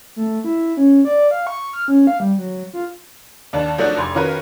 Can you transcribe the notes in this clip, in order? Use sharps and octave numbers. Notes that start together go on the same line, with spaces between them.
A3
E4
C#4
D5
F5
C#6
F6
C#4
F5
G3
F#3
F4
D#2 D4 A5
F3 F#3 A3 D4 D#4 F#4
F1 C6 D6 G#6
D#3 C#4 F4 F#4 A#4 B4